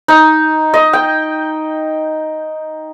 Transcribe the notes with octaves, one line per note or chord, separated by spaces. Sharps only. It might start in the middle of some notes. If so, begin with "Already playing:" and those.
D#4
D#5
G5